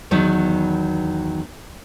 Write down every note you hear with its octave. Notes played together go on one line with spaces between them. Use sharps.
E2 D#3 F#3 B3